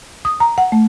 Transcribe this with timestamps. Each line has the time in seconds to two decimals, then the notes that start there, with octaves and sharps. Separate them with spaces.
0.25 D#6
0.40 A#5
0.58 F#5
0.72 A3